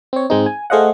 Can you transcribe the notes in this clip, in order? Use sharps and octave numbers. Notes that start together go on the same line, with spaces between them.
C4 C#5
G#2 G#3 C4 D#4
G#5
A3 G#4 C5 D#5 F5 F#5